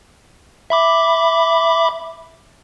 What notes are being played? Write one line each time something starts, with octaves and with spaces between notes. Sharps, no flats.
E5 B5 D6